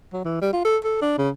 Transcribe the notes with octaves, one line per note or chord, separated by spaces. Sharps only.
F#3
E3
G3
F4
A4
A4
D4
C#3